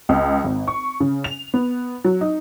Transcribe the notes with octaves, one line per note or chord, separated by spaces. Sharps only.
C#2
G#1
C#6
C#3
F7
B3
F#3
D#4